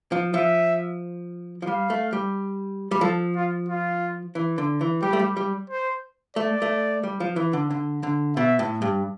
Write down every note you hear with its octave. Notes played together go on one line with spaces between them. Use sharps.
F3
F3 E5
F3
G3 F5
A3
G3
G3
F3 A4
F4
F4
E3
D3
E3
G3 G4
A3
G3
G3
C5
A3 D5
A3
G3
F3
E3
D3
D3
D3
B2 E5
A2
G2